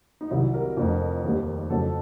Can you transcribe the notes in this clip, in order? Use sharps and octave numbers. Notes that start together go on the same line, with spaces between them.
D#4
C2 C3 D#3 F#3 E4
A#4
F2 D3 F3 A3
D#2 D#3 G3
F2 C#3 F#3 A3 A4